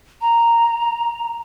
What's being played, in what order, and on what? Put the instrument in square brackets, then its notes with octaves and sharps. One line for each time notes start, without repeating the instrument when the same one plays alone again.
[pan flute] A#5